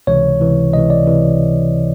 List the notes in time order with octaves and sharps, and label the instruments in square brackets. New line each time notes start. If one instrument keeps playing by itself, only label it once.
[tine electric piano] C#2 C3 E3 C#5
C#2 C3 E3
C#2 C3 E3 D#5
D5
C#2 C3 E3